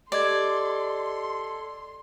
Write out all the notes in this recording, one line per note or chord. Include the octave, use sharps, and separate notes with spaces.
G4 A4 D5 D#5 C6 G#6